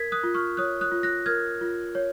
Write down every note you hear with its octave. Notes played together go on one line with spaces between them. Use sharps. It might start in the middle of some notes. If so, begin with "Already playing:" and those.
Already playing: A#4 G#6 B6
D#6 F#6
F4
C#6 F6
C#5 D#6 F#6
D#6 F#6
F4
F#6 A#6
A#4 F6 G#6
F4
C#5